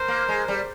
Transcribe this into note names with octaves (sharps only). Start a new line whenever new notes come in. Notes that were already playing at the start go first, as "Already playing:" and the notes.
Already playing: A#4 C5
A#3
G#3
G3